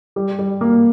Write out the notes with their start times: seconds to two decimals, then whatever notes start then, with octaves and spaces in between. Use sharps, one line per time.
0.16 G3
0.39 G3
0.61 A#3